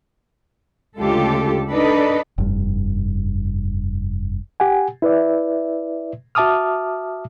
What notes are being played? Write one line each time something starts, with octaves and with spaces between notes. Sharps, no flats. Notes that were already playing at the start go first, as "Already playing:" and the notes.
D2 C#3 G#3 F4 G4 A4
D4 D#4 A4 B4 D5 D#5
F1 G2
G4 F#5 G#5
E4 B4 D5 E5
F#4 E5 A5 D6 D#6 F6